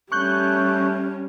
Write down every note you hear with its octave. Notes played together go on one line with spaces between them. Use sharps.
G3 A3 C#4 C#6 F#6 G6